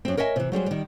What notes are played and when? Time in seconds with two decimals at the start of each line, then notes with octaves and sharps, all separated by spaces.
0.05 F#2 C4
0.17 A#4 C#5 D#5 E5 G#5
0.36 C3 E3
0.52 F#3 G3 G#4 C5
0.66 D#3 G3